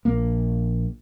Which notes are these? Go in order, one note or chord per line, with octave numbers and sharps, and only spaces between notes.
A#1 A#3